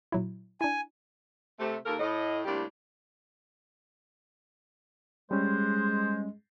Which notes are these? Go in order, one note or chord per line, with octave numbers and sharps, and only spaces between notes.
A#2 F#3 E4
D4 E4 G#5
C3 A3
D#2 A#3 A4 A#4
A2 D#5
A2 C3 G3 A#3 D4 G4
G3 G#3 C#4 C5